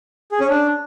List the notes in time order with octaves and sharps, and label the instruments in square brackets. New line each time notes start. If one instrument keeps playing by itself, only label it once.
[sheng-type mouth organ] G#4
C#4
D4